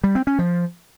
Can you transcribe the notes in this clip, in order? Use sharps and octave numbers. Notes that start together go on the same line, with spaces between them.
G3
C4
C#4
F3